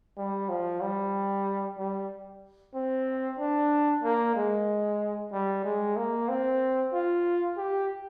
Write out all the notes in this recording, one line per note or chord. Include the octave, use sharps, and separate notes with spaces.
G3
F3
G3
G3
C4
D4
A#3
G#3
G3
G#3
A#3
C4
F4
G4